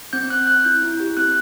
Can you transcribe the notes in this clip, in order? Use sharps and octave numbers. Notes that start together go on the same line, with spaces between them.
C4 G6
C4 F#6
C4 F#6
E4 G6
E4
G4
C4 F#6